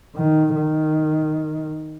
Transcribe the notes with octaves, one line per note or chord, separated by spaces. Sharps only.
D#3
D#3